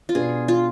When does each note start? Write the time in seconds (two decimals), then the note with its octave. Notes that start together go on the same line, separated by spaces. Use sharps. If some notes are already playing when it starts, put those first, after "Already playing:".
0.09 F4
0.15 B2 B3 D4 G#4
0.48 F4